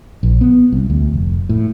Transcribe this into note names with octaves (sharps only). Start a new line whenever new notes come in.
A#1
B3
C2
D2
F1
A2